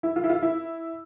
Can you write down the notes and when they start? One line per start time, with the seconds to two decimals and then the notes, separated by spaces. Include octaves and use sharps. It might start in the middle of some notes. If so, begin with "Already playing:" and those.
0.03 E4
0.16 F4
0.24 E4
0.29 F4
0.42 E4